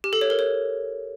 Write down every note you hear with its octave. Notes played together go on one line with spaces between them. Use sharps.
G4
A4
C#5
A#4
C#5